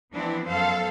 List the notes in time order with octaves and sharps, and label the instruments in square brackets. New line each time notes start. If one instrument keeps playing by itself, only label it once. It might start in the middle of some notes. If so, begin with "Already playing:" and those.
[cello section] E3 F3 B3 C4 D4 E4
F#2 B3 A4 C5 F5